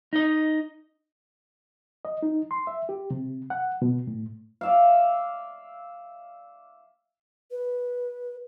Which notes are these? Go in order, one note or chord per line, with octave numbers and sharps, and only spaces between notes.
D#4 D#5
D#5
D#4
C6
E5
G4
C3
F#5
B2
A2
D5 E5 F5
B4